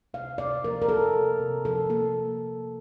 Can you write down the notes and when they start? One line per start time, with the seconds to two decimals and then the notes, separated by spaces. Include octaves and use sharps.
0.14 C3 F5
0.38 C3 D5
0.64 F3 A#4
0.82 A#4
0.89 A#3 A4
1.15 C3
1.39 C3
1.65 F3 A4
1.89 A#3 A4